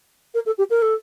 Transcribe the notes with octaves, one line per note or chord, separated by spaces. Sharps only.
A#4
A4
G4
A#4
A4